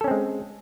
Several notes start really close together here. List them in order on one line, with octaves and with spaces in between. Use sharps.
A4 C#4 C4 G#3